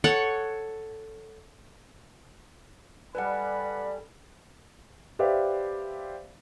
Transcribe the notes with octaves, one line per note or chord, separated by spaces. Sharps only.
A4 C#5 F#5
G3 A4 B4 D5 F#5 G#5 B5
G4 B4 C5 D5 E5 F5